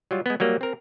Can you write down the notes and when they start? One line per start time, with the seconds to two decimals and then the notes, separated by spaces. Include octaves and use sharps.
0.11 F#3 G3 F4
0.26 G#3 B3
0.40 F#3 G3 A#3
0.61 C4 A#4